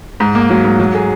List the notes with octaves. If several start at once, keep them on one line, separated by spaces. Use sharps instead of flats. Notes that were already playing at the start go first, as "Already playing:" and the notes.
G#2
A#3
F#3
G#2
F#3
G#4